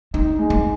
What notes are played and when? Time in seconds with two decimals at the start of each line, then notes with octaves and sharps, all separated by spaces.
0.14 C4 D#4
0.39 G#3
0.50 C4